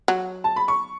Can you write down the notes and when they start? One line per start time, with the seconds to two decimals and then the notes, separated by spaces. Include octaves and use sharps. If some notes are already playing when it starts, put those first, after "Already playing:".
0.08 F#3
0.44 A5
0.56 B5
0.68 C#6